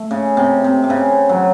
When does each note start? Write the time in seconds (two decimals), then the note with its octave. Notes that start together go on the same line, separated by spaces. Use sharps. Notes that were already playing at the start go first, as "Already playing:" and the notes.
Already playing: A3
0.11 C#3
0.37 C3
0.64 C3
0.84 C3
0.90 C#3
1.29 F#3